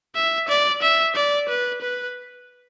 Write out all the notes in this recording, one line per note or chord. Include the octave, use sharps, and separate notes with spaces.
E5
D5
E5
D5
B4
B4